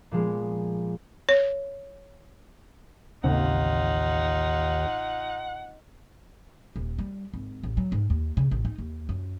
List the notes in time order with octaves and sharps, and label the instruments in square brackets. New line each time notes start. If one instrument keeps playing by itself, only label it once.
[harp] A#2 F3 G#3 B3
[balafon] C#5
[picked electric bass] A1 C#3 C4 [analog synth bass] D#2 [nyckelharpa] D#4 F4 [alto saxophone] F#5
[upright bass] D#1
G3
G#1
A1
F#3
G#2
D#2
C#3
A1
D#4
D#2
F#2